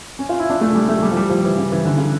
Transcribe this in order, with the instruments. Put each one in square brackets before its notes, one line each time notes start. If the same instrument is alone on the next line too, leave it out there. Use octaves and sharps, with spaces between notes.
[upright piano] C#4
F4
E4
D4
A3
G3
A3
G3
F3
G3
F3
E3
C#3
E3
D3
C#3